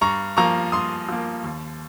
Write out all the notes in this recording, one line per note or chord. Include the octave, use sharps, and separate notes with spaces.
G2 A#5 C#6
F3 A#3 A#5 C#6
G2 C6 D#6
F3 A#3
D#2